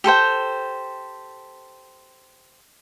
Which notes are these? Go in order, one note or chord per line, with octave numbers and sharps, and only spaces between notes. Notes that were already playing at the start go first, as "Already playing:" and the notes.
G4 A4 C5 G5